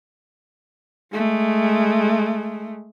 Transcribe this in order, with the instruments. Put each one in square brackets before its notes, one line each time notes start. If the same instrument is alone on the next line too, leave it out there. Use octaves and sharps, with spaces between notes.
[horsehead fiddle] G#3 A3